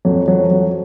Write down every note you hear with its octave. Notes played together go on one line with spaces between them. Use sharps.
F2 F#3
F#3
F3
F#3